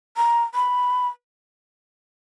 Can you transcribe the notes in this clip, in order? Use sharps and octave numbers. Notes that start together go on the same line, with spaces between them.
A#5
B5